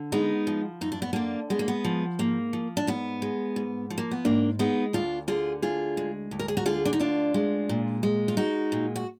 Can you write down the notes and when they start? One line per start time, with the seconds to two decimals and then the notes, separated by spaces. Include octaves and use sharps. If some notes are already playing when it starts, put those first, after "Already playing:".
Already playing: D3
0.12 G#3 B3 D#4
0.47 F3
0.81 F#2 D#4
0.92 D4
1.02 B3
1.13 D3 A#3 D4
1.50 G#3 B3
1.59 A#3
1.68 B3
1.84 F3
2.19 G#2 A#3
2.53 F3
2.77 D4
2.87 G#2 B3
3.22 G#3
3.56 G#2
3.90 F3
3.98 A#3
4.11 B3
4.25 G#2 A#3 D4
4.59 G#3 B3 D#4
4.93 D2 D4 F4
5.28 D3 F4 G#4
5.62 D2 F4 G#4
5.97 G#3
6.31 D2
6.39 A#4
6.48 G#4
6.57 F#4 A#4
6.66 D3 F4 G#4
6.85 D4
6.93 D#4
7.00 D2 D4 F4
7.34 G#3
7.69 A#2
8.03 G#3
8.28 F4
8.37 G#3 D#4 F#4
8.72 A#2
8.96 F#4